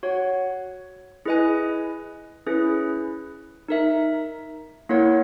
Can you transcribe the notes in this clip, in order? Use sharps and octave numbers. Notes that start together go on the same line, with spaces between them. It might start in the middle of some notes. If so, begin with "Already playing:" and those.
F#4 C#5 F#5
E4 G#4 B4 D#5 G#5
C#4 E4 G#4 B4
D#4 A#4 E5
A#3 E4 A#4 C#5 F#5